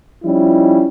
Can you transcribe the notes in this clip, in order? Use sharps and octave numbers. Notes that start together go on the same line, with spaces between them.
F3 G3 C#4 D#4 E4